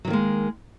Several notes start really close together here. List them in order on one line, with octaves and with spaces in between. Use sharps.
F#3 D#3 A#3 G#3